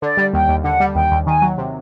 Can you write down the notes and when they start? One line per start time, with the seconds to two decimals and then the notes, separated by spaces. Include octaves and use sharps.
0.02 D3 D5
0.17 G3
0.34 D#2 G5
0.49 D#2
0.64 D3 F#5
0.80 G3
0.95 D#2 G5
1.12 D#2
1.27 D#3 G#5
1.42 F#3
1.58 C3